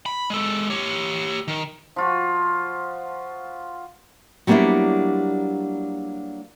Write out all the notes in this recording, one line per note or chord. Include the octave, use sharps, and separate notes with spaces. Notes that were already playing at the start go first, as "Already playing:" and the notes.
B5
G#3 A4
G4 C#5
D#3
F3 F4 F#4
F#3 G3 A#3 B3 D4 E4